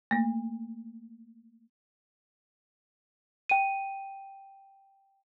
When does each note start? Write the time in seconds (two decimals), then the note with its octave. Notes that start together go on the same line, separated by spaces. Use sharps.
0.11 A3 A#3
3.49 G5 D#7